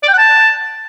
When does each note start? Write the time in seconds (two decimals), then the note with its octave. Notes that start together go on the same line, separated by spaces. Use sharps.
0.03 D5
0.08 G5
0.13 F#5
0.18 A5